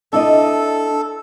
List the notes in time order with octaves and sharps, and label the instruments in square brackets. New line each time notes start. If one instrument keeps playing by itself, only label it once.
[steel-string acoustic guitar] D4 E4 D#5 [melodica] A4